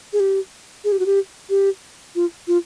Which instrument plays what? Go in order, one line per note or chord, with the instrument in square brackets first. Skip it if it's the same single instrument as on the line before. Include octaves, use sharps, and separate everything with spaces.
[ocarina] G#4
G4
G#4
G4
F#4
G4
G4
F4
F4